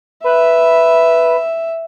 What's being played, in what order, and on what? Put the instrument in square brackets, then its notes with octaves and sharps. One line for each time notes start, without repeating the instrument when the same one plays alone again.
[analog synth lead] B4 [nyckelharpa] E5